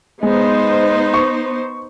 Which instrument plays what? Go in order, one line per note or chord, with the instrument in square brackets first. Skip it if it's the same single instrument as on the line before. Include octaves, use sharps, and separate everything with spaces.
[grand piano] G#3 [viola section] B3 D#4 C5 [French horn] D#5
[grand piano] C#6